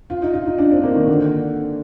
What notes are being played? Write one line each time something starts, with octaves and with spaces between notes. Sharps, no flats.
F4
D#4
F4
D#4
D4
C4
A#3
D#3
D3